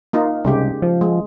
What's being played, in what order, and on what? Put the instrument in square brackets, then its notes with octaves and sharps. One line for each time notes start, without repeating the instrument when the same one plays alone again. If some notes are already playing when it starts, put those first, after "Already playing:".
[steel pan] A#3 D#4 F4
[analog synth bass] C2 [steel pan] C#3 G#3 G4
[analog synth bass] F3
[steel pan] G#3